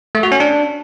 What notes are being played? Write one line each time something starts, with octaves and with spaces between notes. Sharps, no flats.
A3
F#4
C#4
D4